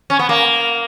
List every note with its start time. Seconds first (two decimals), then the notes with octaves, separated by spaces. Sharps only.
0.10 C#4
0.19 B3
0.29 A#3